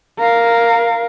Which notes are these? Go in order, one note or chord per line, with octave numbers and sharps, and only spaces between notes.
A#4 F5